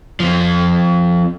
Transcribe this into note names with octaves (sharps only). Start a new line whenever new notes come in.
F3 C4